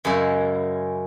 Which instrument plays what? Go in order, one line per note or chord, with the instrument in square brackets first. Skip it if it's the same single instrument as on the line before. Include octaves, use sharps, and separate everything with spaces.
[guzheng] F#2 C#3 G#3 E4